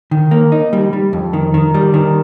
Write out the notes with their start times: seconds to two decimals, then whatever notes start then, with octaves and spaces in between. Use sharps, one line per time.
0.11 D#3
0.31 A#3
0.52 D#4
0.73 G3
0.93 G3
1.13 F2
1.33 D#3
1.54 D#3
1.74 G3
1.94 D#3